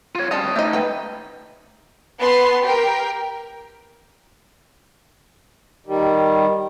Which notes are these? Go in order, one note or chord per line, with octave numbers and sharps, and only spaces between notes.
F4 C#5
G3 C#4 D#5 A5
A3 D#4 G4 D#5
B4 G5
B3 A5 C6
G4 A#4 G5
D#3 G3